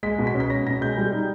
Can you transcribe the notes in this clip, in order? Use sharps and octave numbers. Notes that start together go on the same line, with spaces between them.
G#3 B6
B2
B6
C#4
B6
C#4 A#6
B2 A#6
G#3 G6
G3
D#4